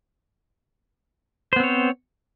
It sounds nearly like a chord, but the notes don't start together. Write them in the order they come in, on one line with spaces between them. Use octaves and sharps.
C5 B3 C4 C#5